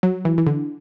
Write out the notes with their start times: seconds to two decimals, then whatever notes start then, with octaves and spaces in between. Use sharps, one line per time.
0.03 F#3
0.25 E3
0.38 E3
0.47 D3